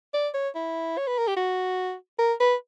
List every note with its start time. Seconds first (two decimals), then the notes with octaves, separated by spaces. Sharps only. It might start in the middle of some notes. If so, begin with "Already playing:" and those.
0.14 D5
0.34 C#5
0.55 E4
0.97 C#5
1.07 B4
1.18 A#4
1.27 G4
1.36 F#4
2.19 A#4
2.40 B4